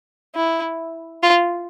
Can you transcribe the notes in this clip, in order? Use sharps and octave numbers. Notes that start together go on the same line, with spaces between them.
E4
F4